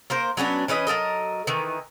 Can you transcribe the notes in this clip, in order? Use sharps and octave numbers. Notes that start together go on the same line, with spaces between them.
A#3 A#4 C5
F#3 B3 C#4 D4
E3 C#4 B4 D#5
F#3 A4 A#4 D#5
D#3 E3